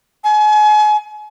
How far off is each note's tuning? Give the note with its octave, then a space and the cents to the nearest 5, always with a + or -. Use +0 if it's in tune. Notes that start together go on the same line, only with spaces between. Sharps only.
G#5 +35